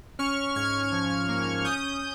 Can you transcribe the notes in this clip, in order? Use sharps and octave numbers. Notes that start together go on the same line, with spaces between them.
C#4 C#6 F6
G#2 F6 G#6
F3
A#3
C#4 D#6 G6